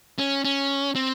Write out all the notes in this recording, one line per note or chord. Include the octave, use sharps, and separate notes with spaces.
C#4
C#4
C4